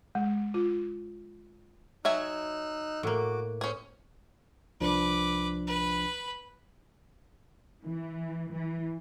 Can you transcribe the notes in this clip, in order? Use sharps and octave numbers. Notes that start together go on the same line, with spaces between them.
G#3
F4
F#3 D#4 E5 G#5 E6 F#6
A2 A#3 F#4 D6
C#4 G#4 C5
C2 F3 D4 B4 D6
B4 B5
E3
E3